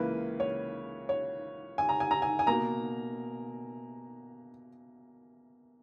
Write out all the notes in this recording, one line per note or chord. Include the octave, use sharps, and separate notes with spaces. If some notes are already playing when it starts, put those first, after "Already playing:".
Already playing: C#2 C#3 E3 A#3 B4
C#5
C#5
G#5
A#5
G#5
A#5
G#5
G#5
B2 A#3 A#5